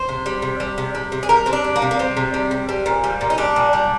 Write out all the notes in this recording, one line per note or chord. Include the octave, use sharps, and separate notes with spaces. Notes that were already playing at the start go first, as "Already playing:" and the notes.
Already playing: C5
C3
G3
C3
G3
C3
G3
C3
G#4
G3 A#4
C3 C4
D4
G3
A#3
C3
A#3
G3 C4
C3
G3
C3
G3
A#2
G3
A#2
D#4
G3 D4
A#2
G3